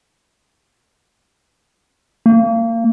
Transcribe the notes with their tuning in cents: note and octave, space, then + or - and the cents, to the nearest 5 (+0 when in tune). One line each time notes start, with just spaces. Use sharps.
A#3 -30